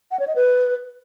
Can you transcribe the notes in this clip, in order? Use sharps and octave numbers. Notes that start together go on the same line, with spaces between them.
F#5
C#5
D#5
B4